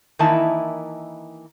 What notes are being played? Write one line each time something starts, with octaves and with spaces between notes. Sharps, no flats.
D#3 E3 A#3 D#4 E4 A5